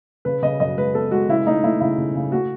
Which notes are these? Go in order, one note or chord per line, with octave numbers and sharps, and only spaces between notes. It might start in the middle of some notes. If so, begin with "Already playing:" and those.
C#3 B4
C#3 D#5
F#2 D#5
G#3 B4
B3 A4
G#3 F#4
C#3 E4
A3 D#4
A3 E4
C#3 E4
C#3
C#3
A3 F#4